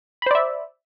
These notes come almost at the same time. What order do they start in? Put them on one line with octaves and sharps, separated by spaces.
B5 C5 D5 E5